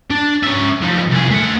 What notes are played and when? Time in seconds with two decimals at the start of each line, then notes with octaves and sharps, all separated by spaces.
0.10 D4
0.43 C#4 E5
0.81 F2 D#4
1.10 C2 G#4
1.30 A3 F#5